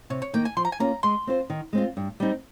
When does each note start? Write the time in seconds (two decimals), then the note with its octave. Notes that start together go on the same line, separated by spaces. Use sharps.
0.10 C3 C#5
0.22 C#5
0.33 D#3 A#3 D#4 G5
0.45 G#5
0.57 F3 C6
0.65 A#5
0.72 G#5
0.80 A#3 C#4 F4 A#5
1.03 G#3 C6
1.27 C4 F4 C5
1.50 D#3
1.73 G#3 C4 F4
1.97 G2
2.20 G3 C4 D#4